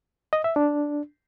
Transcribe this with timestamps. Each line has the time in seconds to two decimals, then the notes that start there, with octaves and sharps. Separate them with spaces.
0.33 D#5
0.44 E5
0.56 D4